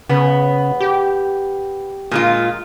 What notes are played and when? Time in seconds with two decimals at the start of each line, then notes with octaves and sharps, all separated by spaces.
0.09 C#3 B3
0.80 G4
2.11 A#2 G#3 F4